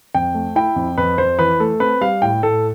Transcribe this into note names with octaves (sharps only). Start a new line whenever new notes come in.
F2 G5
A3
E4 G5
F2
F2 B4
F2 C5
E3 B4
A3 A4
C4 B4
G3 F5
A2 G5
A2 A4